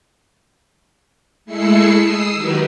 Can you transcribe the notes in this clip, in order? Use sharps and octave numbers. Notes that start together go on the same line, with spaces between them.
G#3 A3 E4 E6 C7 C#7
D#6 E6 C7
D#3 F#3 G4 A#4 B4